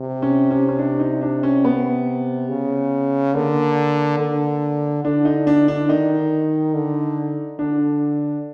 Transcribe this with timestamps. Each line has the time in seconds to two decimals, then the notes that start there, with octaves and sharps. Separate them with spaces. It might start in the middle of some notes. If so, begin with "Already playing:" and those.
Already playing: C3
0.22 C#4
0.51 C#4
0.69 C#4
0.79 D4
1.00 D#4
1.22 D4
1.43 C#4
1.65 B3
2.49 C#3
3.34 D3 A#3
4.19 D3
5.04 D3 D4
5.25 D#4
5.47 D4
5.68 D4
5.89 D#3 D#4
6.74 D3
7.59 D3 D4